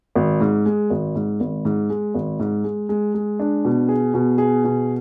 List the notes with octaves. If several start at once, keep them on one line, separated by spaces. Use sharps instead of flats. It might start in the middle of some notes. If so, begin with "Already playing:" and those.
G#1
G#2
G#3
G#1
G#2
G#1
G#2
G#3
G#1
G#2
G#3
G#3
G#3
D4
B2
G#4
B2
G#4
B2